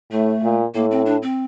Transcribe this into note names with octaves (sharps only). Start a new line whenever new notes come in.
A2 A3
A#2
A2 A#3
C4
D4
C4